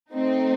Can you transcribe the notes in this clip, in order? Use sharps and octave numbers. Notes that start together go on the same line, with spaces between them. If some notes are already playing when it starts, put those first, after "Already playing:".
A3 C4 D#4